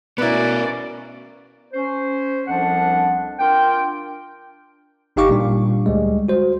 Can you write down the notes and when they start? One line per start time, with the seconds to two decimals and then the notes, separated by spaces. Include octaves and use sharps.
0.18 B2 B3 C#4 E4 A#4 B4 D5
1.73 C#4 C5
2.48 C2 F2 F3 D4 F#5
3.39 D4 F4 A#4 G5
5.16 G1 D#4 G4 F5 C#6 D6
5.29 A#2 G3 D4
5.86 D2 G3 G#3
6.28 F#4 C5